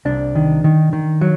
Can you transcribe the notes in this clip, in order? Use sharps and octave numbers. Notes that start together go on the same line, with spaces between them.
C2 D4
D#3
D#3
D#3
F#3